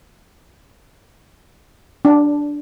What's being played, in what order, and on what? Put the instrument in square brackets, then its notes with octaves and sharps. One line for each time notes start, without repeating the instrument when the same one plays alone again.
[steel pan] D4